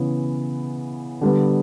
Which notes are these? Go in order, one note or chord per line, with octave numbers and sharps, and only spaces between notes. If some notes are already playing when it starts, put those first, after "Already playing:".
Already playing: C#3 E3 B3
D3 G3 B3